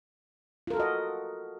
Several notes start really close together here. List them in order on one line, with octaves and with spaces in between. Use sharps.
F4 A#4 A4 F#4 D#5